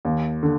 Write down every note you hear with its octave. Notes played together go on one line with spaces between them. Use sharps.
D#2
D3